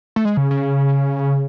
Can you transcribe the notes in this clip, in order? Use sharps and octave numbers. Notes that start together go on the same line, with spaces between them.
A3
G#3
C#3
C#3